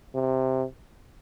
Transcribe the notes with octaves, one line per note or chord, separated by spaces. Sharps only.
C3